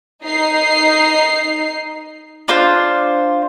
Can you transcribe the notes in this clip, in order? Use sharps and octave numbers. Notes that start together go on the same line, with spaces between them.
D#4 C7
D4 F4 C5